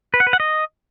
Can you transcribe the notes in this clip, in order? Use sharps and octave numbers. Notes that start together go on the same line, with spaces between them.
B4
F#5
B4
F#5
D#5